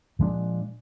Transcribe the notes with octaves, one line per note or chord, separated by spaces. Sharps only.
A#2 F3 G#3 D4